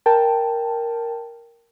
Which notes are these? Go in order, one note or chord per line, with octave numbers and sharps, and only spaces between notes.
A#4 G5 A5